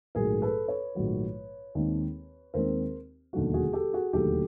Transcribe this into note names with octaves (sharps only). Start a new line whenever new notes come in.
A#1 G#2 D#3 F#3 A3 G#4 A#4
A4 B4
B4 C#5
A#1 G#2 D#3 F#3 A3
D#2 D#3 G#3 C4
D#2 D#3 G#3 C4 A#4 C5
E1 D#2 D3 F#3 A3 F#4
F#4 G#4
G4 A4
F#4 G#4
E1 D#2 D3 F#3 A3 G4 A4